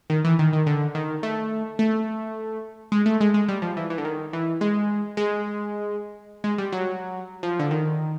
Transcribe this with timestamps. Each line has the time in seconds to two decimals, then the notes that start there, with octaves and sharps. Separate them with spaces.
0.10 D#3
0.25 E3
0.39 D#3
0.53 D#3
0.66 D3
0.95 D#3
1.23 A3
1.79 A3
2.92 G#3
3.06 A3
3.21 G#3
3.34 G#3
3.48 G3
3.62 F3
3.77 E3
3.90 E3
3.98 D3
4.05 D#3
4.33 E3
4.61 G#3
5.17 G#3
6.44 G#3
6.58 G3
6.72 F#3
7.43 F3
7.59 D3
7.71 D#3